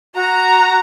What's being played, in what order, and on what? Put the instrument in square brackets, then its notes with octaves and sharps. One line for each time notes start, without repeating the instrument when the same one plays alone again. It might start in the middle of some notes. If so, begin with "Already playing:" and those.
[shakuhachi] F#4 [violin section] A#5